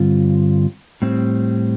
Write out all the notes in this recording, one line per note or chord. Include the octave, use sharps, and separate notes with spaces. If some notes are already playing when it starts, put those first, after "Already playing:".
Already playing: G2 D3 G3 C4 F4
A2 G3 C4